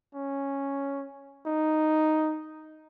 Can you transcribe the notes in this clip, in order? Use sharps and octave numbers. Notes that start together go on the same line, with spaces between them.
C#4
D#4